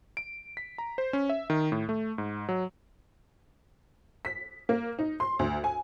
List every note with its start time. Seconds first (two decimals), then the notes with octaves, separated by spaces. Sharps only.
0.17 D7
0.57 B6
0.78 A#5
0.98 C5
1.13 C#4
1.30 E5
1.50 D#3
1.72 A2
1.89 A3
2.18 G#2
2.49 F#3
4.25 B6
4.69 A#3
4.99 D#4
5.20 C6
5.39 D2
5.64 G#5